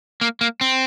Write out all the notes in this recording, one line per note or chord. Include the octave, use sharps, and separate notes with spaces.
A#3
A#3
C4